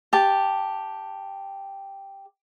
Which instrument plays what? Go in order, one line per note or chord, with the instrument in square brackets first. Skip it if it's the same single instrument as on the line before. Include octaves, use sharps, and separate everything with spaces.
[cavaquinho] G4 A5